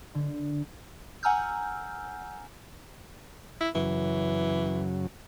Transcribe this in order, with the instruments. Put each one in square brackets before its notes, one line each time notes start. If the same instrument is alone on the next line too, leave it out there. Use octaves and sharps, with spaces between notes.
[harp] D3
[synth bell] F#5 G#5 A#5 E6 F6 G6
[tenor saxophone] E4
[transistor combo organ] F#2 C#3 F#3 [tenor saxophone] E3